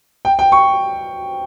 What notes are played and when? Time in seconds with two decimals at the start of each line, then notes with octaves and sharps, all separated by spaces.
0.25 G5
0.39 G5
0.52 C#6